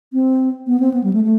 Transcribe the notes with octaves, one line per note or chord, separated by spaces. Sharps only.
C4
B3
C4
B3
G3
A3
A3